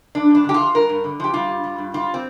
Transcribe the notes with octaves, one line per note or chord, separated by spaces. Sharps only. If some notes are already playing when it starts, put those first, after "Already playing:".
G2 D4
G2 D4
D3 G4
F4
F3
G2 A#4
G2
D3
F3 G4
G3 F4
G2
G3
G2
G3 F4
C4